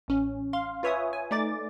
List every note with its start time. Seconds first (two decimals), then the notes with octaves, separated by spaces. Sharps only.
0.08 A1 C#4
0.53 F5 C6
0.83 F4 B4 C#5 E5 G#5 D#6
1.13 G#5
1.31 A3 D#4 D5 D6 A6